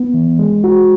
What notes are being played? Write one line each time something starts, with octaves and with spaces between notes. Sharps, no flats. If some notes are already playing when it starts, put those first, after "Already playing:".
Already playing: B3
E3
G#3
F#4